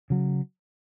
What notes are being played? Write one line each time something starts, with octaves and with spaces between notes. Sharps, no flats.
C#3 F#3